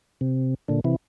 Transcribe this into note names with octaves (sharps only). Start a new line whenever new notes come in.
C3
A#2 D3
C3 E3